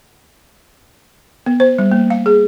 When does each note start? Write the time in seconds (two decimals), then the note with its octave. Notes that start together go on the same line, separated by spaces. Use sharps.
1.46 B3
1.60 C5
1.78 G3
1.91 A#3
2.10 F5
2.26 G#4